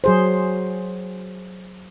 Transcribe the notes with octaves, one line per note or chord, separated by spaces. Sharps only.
F#3 G#4 C5